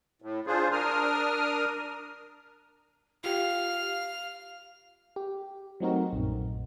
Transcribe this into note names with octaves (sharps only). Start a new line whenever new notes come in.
A2
D4 F4 G#4 C5
D4 A#4 D#6 F6
F4 G4 F5 F6
G4
F#3 A3 C4 D#4 F#4 A#4
A#1 F#2